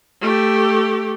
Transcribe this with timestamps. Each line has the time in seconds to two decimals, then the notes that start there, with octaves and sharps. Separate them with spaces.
0.21 A3 G4